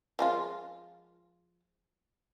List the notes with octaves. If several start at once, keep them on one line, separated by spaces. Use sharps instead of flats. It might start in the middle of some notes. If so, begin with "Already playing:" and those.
F3 G#3 F4